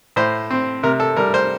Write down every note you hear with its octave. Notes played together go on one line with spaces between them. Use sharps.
A2 C5
C4
C3 A#4
A4
G3 A#4
C5